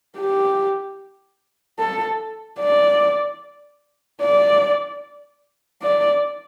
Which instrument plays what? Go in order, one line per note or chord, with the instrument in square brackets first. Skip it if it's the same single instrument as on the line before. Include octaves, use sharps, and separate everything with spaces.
[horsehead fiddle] G4
A4
D5
D5
D5